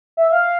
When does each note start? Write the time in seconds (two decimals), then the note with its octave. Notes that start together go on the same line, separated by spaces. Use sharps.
0.17 E5
0.32 F5